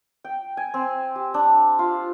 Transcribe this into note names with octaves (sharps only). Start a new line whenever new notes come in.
G5
G#5
C4
G4
D4
F4